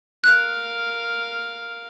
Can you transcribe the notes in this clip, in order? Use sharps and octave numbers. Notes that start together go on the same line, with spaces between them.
A#4 F5 F#6